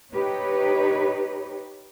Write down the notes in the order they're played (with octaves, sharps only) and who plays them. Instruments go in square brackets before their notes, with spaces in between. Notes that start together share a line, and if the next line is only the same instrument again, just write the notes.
[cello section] D#4 G4 B4 C#5